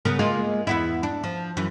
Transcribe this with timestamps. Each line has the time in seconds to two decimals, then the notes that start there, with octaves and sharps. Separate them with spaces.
0.05 C#3 B3 A#4
0.19 G#3 A#3 F4
0.67 E2 B3 E4
1.03 D4
1.24 F3
1.57 F#2 E3